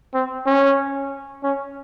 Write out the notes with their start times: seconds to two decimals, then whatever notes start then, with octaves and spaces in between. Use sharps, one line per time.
0.14 C4
0.47 C#4
1.43 C#4